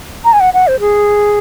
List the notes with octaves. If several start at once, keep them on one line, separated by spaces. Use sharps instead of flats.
A#5
G#5
F#5
F#5
C5
G#4